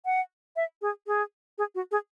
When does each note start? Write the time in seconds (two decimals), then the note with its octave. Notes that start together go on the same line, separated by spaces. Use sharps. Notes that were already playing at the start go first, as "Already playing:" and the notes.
0.05 F#5
0.56 E5
0.82 G#4
1.07 G#4
1.58 G#4
1.75 F#4
1.91 G#4